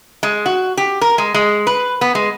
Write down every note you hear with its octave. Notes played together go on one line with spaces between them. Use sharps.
G#3
F#4
G4
A#4
G#3
G#3
B4
B3
G#3